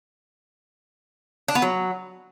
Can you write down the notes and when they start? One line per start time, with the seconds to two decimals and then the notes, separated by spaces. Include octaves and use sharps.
1.48 D4
1.55 B3
1.62 F#3